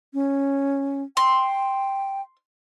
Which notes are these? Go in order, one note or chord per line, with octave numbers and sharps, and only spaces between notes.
C#4
G5 C6